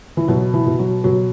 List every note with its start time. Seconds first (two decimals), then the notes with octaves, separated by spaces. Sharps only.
0.17 E3
0.28 B2 F#3
0.54 E3
0.66 B2
0.79 F#3
1.04 B2 F#3